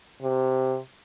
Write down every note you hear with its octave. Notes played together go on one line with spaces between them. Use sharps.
C3